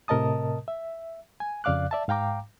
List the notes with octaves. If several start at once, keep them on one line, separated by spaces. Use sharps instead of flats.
A2 C3 A#4 D#5 A5 D#6
E5
G#5
F2 C#3 D5 F5 D6 F#6
D5 E5 A5
G#2 F5 G5 A#5 D6